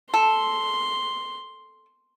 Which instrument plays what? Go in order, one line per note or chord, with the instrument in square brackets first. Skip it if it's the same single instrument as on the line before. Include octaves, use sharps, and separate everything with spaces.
[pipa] A4 [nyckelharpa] C6